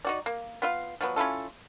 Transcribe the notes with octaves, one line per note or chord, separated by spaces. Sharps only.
D#4 F#4 D5
A#3
B3 F4 E5 F5
F3 F#3 B3
C#4 E4 F4 A4